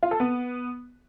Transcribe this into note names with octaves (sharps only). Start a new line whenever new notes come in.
F4
A4
B3